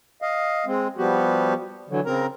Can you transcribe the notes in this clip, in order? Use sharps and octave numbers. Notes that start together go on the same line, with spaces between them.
D#5 F5
G#3 C4
F3 G3 B3 F#4 G4
D3 E3 F#3
C#3 C4 A#4 A#5